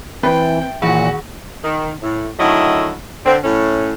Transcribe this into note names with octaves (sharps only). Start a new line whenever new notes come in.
E3 C4 B4 E5 G5 B5
D#2 A#2 D#3 E3 F#4 G#4
D#3
A2
D3 D#3 F#3 A3 E4 D#5
D3 C4
A2 C#4